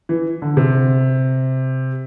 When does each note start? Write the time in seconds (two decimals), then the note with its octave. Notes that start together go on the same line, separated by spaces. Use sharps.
0.09 E3
0.42 D3
0.57 C3